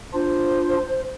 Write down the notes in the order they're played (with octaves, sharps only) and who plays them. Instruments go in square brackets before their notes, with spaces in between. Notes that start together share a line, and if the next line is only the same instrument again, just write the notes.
[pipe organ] D4 F4 [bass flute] C5